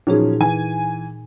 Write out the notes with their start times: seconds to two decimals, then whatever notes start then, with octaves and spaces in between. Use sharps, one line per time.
0.07 A#2 F3 F#3 C#4 D#4 G#4
0.40 E3 G#5